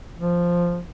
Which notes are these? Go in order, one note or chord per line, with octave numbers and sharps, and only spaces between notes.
F3